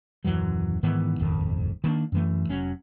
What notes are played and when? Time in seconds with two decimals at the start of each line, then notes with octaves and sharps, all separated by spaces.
0.24 D#1 F#2 E3 F#3
0.83 G#2 D#3 E3 B3
1.19 D#1 G#1 F2 D#3
1.84 D#3 A#3 D4
2.12 F#2 E3 A3
2.49 F1 F#3 C#4